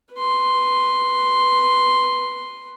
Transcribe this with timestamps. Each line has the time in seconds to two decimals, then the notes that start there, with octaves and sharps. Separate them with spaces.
0.14 B4 C6